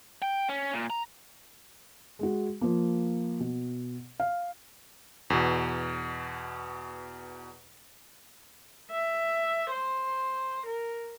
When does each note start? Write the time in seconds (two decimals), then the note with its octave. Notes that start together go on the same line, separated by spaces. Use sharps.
0.22 G5
0.49 C#4
0.73 A#2
0.90 A#5
2.19 G#3 F#4
2.61 F3 A#3
3.40 B2
4.20 F5
5.30 E2 B2
8.91 E5
9.71 C5
10.66 A#4